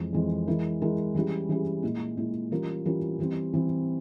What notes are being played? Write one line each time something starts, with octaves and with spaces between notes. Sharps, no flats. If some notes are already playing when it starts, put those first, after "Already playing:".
Already playing: F2 E3 G#3
F2 E3 G#3
E3 G#3 E4 A#4
E3 G#3 E4 A#4
E3 G3 C#4 E4 G#4
E3 G3 C#4 E4 G#4
A#2 G#3 E4
A#2 G#3 E4
E3 G3 C#4 F4 A#4
E3 G3 C#4 F4 A#4
E3 G3 C4
E3 G3 C4